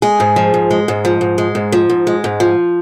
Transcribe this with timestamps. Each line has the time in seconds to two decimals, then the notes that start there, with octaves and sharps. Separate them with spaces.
0.02 G#3 G#4
0.20 G#2
0.36 F3
0.54 G#2
0.71 G#3
0.88 G#2
1.05 F3
1.21 G#2
1.38 G#3
1.55 G#2
1.72 F3
1.90 G#2
2.07 G#3
2.24 G#2
2.40 F3